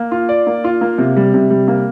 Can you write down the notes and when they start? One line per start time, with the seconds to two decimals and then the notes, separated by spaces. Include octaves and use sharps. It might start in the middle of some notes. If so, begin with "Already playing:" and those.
Already playing: A#3
0.11 F4
0.29 D5
0.47 A#3
0.64 F4
0.81 A#3
0.98 C3
1.17 G3
1.34 C3
1.50 G3
1.68 A#3